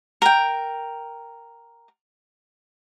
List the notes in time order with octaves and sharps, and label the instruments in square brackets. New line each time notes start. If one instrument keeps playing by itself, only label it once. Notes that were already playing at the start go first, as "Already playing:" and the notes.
[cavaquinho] A#4 G5